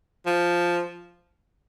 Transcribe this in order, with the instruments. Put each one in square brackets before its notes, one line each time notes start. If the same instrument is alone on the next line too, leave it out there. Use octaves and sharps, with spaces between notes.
[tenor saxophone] F3